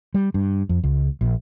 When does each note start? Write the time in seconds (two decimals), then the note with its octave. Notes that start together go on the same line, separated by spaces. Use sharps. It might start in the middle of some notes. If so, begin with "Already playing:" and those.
0.14 G3
0.34 G2
0.69 F2
0.84 C#2
1.21 A#1